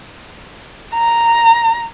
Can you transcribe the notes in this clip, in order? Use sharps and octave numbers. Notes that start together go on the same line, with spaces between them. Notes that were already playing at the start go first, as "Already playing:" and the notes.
A#5